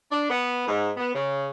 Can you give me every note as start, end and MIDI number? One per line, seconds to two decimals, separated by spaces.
0.11 0.25 62
0.29 0.64 59
0.67 0.89 44
0.96 1.13 59
1.13 1.49 49